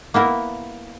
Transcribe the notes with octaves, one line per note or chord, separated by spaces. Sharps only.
A#3 B3 E4 A#4